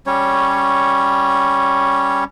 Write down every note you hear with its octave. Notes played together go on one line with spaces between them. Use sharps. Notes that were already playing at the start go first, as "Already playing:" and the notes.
G3 C#4 C#5